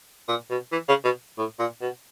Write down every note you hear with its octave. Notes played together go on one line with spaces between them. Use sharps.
A#2
B2
E3
C#3
B2
A2
A#2
B2